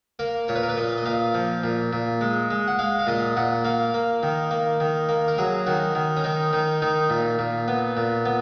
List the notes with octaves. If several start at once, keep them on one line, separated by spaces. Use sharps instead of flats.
A#3 A#4
A#2 C#5
B4
A#4
B4
A#2 D#5
D#5
A#2 F5
F3
A#2
A#2
G#3
G#3
F#5
G#3 F5
F5
A#2 D#5
A#2 F#5
A#3 F5
A#3
D#3
A#3
D#3
A#3
A#4
F#3 G#4
D#3 F#4
D#3
C#4
D#3 D#4
D#3 D#4
D#3 D#4
A#2
A#2
B3
A#2
B3